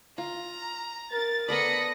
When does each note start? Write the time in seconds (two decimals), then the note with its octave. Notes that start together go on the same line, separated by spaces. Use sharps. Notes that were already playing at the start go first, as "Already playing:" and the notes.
0.18 F4 A#5
1.13 A#4 A6
1.48 B3 A4 D5 B5 D#6 A#6 C#7